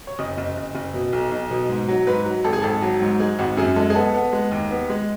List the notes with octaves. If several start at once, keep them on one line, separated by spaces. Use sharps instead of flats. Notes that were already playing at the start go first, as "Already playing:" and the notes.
C#5
F#1 D#5
F#1
F#1
F#1
B2
B1
B1
B2
G#2
F#3
G#2 B4
F#3
G#1 A4
G#4
G#1 A4
F#3
G#2
G#3 G#4
G#1 F#4
F#2 G#4
G#3 A4
G#4
B3 A4
B3
G#3
D#2
B3
G#3